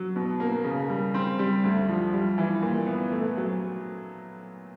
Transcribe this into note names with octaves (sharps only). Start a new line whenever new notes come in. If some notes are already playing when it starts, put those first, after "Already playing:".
Already playing: F#3
B2
A#3
C#3
G3
C4
G3
D2
F3
G3
E3
A#2
B3
A3
F#3